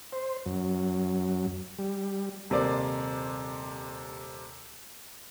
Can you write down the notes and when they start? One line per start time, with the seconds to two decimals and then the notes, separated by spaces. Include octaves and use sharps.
0.12 C5
0.46 F#2
1.79 G3
2.50 D#1 C3 A#3 C5 D5